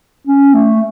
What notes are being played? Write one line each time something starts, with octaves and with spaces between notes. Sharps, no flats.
C#4
A3